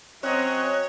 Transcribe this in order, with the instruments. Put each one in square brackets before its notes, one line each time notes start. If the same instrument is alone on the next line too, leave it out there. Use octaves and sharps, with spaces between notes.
[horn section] F#3 C4 D#5 [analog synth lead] C#4 [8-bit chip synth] C#5 [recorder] F#6